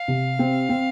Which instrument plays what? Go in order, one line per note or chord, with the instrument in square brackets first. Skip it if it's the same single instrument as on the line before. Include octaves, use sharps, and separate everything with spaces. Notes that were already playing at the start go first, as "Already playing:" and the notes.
Already playing: [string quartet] F5
[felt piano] C3
C4
C4